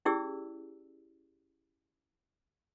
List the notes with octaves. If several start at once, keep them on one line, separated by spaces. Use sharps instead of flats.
C#4 E4 G4 G#4 D5 E6